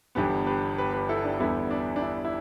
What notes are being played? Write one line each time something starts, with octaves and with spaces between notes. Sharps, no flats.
G1 G2 E3 B3 G4 B4
G4 B4
G4 B4
G4 B4
E4 A4
D4 G4
E2 D3 G3 B3 E4
D4
D4
E4
E4